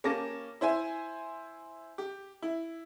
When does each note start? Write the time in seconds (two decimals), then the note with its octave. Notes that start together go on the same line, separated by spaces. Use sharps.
0.04 A#3 C#4 G4 A5 D6 A#6
0.61 E4 C5 E5 G#5
1.98 G4
2.42 E4